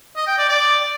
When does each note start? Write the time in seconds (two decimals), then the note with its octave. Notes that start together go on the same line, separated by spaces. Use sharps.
0.16 D#5
0.27 G5
0.38 D5
0.49 D5